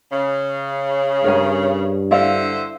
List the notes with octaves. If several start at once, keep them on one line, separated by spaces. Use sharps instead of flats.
C#3
G2 A#4 C#5 G#5
D3 E4 C5 D5 E5 F5